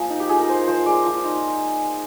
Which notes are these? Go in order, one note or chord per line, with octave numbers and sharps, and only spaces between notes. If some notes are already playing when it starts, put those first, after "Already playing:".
Already playing: F3 A#3 G#4
D#4
G4
F3 G#4
A#4
D#4 C5
F3 C5
G#3 D5
F3
D#4